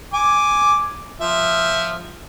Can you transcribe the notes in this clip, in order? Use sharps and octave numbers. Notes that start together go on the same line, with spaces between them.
G#5 D6
F3 E5